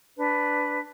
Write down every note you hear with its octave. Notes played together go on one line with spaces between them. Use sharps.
D4 B4